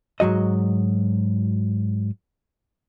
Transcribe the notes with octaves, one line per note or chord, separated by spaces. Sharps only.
G#2 F#3 F#4 D#5